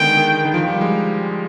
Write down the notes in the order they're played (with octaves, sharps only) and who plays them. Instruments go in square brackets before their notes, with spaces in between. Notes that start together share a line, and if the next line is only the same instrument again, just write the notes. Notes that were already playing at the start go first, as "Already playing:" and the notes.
Already playing: [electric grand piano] D3 D#3 G#3 B3 [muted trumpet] G5
[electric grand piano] D#3
D#3
F3
G3
G#3